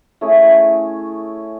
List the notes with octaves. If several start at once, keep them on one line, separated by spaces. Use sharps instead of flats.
A3 C#4 E4 G#4